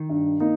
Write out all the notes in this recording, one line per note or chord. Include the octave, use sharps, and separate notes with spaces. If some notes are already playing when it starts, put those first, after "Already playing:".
Already playing: D#3
G2
A#3 D#4